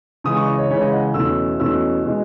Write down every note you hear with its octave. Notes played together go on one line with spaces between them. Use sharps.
C#3 E3 G#3 D#6
C#6
D#5
C#5
C#3 E3 G#3 C#5
D#5
F#5
E2 B2 A3 C#4 E4 E6
E2 B2 A3 C#4 E4 E6
B2 G#3 D#4